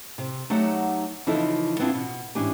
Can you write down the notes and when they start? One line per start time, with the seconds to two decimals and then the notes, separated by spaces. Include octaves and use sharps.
0.18 C3
0.50 F#3 A3 D#4 G4 F#5
1.26 C#3 E3 F3 D#4 E4 A4
1.79 B3 C4 D4 E4 F4
1.94 B2
2.35 G#2 E3 C#4 D4 G4 G#5